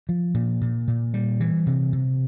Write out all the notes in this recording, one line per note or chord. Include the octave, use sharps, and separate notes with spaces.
F3
A#2
A#2
A#2
G3
E3
C3
C3